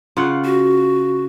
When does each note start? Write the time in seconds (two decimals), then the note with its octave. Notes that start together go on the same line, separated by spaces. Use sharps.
0.17 C#3 F4 F#5
0.45 F#4